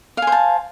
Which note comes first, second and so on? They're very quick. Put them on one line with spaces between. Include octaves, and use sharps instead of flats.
F5 G#5 C5 A5